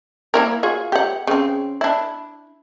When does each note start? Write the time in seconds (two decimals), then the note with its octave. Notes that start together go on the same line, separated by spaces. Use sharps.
0.34 A#3 E4 A#4
0.63 F4 F#4 G#4
0.92 G4 F#5
1.27 C#3 C4
1.81 D4 E4